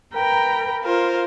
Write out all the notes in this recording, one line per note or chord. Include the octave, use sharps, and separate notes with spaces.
A#4 B4 G5 A#5 B5
F4 A#4 C5